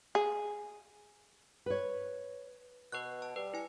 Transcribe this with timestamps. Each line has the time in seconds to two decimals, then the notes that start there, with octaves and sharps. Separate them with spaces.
0.15 G#4
1.66 B4 C#5
2.92 B2 B4 C#6 F#6
3.22 A5
3.36 G3 B4
3.54 E4 G#5